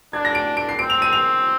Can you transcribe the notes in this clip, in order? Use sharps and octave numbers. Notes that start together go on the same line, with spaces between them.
D4 G#6
A#6
D7
D7
C7
C4 D7
F7
D#7
F7